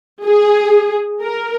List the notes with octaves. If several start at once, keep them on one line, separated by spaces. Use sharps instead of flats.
G#4
A#4